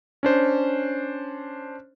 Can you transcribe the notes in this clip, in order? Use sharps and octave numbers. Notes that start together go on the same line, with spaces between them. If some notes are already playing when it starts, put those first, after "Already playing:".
C#4 D4 C5